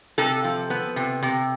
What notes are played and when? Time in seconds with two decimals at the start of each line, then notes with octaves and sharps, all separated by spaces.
0.18 C3 A4
0.44 F3
0.70 B3
0.96 C3
1.23 C3